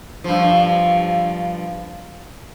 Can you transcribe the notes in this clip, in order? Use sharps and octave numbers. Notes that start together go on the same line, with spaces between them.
G2 F3